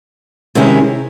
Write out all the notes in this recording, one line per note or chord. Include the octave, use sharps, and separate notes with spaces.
C3 D#3 G#3 C#4 E4